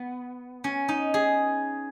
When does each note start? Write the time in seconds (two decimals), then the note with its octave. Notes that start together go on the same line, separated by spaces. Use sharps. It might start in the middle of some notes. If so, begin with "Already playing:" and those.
Already playing: B3
0.64 C#4
0.88 D#4
1.14 G#4